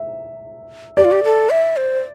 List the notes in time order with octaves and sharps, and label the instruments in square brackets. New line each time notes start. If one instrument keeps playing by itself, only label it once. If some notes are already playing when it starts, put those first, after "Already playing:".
Already playing: [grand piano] E5
[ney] G4 [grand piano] D5
[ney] F4
G4
A4
E5
C5